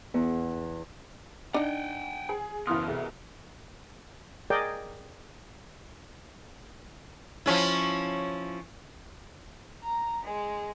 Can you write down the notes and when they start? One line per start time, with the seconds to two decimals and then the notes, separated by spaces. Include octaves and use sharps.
0.14 E2
1.54 D4 D#4 F#5 G5
2.29 G#4
2.67 F#1 B2 E3 F5 C6 D#6 F6
2.88 C2 G#4 A4
4.50 G#4 A#4 D5 D#5 G5
7.46 F3 C#4 E4
9.82 A#5
10.23 G#3